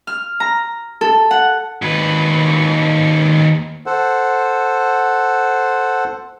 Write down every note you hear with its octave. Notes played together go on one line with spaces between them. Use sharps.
F6
A#5
A4
F#5
D#2 B4
A4 C5 F#5